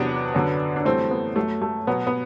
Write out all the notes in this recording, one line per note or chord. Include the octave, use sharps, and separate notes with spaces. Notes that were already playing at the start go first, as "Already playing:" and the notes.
Already playing: E2 C3 F#3 B3 D4
F#2 D3 F#3
D4
F#2 E3 G3 A3 C4
B3
F#2 F#3 A3
A3
B2 F#3 B3
B3